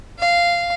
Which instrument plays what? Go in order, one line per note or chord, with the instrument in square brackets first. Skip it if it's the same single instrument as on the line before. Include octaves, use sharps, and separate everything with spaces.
[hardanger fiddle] F5